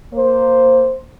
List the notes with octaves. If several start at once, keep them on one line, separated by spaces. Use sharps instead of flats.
A#3 C5